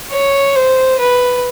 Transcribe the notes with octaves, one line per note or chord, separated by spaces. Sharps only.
C#5
C5
B4